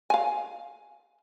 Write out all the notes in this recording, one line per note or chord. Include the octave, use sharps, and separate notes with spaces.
F5 G#5